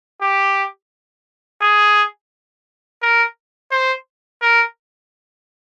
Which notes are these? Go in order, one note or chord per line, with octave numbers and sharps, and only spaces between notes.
G4
G#4
A#4
C5
A#4